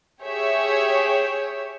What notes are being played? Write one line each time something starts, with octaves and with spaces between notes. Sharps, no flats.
G4 G#4 C#5 E5